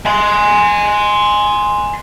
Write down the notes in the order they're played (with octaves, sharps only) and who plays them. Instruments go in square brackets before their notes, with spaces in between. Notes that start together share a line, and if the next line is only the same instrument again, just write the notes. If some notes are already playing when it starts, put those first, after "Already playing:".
[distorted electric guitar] G#5 C6